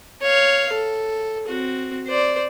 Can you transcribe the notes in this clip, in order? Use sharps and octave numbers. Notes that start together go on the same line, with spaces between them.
C#5 F5
A4
C4 F#4
C5 D5